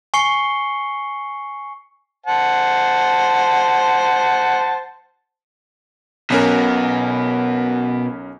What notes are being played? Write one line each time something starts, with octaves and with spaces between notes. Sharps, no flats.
G#5 C#6 C7 C#7 G7
C5 F#5 A5
B1 B2 C#4 A#4